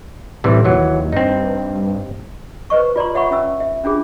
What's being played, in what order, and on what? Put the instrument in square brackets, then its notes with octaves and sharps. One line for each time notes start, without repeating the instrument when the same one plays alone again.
[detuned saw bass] A2 [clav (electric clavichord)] C3 E3 G3
[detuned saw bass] D#2 [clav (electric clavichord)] E3 F#3
[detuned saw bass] G2 [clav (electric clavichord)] C4 D#4
[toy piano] B4 C5 D#5 C#6
F4 D5 A#5 C6
C#5 E5 F#5 B5 C#6
C#4 E5 E6
E5
C#4 D4 F4 G#4